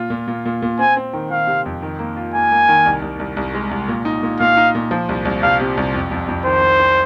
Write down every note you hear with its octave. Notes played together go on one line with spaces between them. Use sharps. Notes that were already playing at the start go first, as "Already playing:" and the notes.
Already playing: A#2 F4
A#2
A#2
A#2
A#2
C4 G#5
C4
D#3
D#3 F5
C3
F2
D#3
A#3
F4
A#3 G#5
A#3
D#3
C2
C2
C2
C2
G#3
C2
A#2
D#4
A#2
A#2 F5
D#4
A#2
F3
C2
C2
C2 F5
C3
C2
F2
F2
F2
D#3 C5
F2
C4